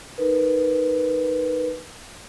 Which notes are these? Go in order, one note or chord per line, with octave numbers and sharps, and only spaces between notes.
D#4 A#4 B4